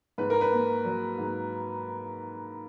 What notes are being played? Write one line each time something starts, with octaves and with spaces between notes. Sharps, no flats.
G#2 B4
A#4
B4
A#3
F#3
G#2